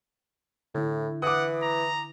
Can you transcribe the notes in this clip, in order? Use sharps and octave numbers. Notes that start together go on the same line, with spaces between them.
A2 D3 E4
E3 F#5 D6 D#6
A#5